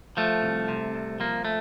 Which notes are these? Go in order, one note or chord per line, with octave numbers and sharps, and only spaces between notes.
F3 A3
C2
C3
C2
F3 A#3
A3